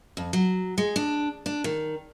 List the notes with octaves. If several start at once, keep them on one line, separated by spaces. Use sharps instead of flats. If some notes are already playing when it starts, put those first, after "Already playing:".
F2
F#3
G#3
D4
D4
D#3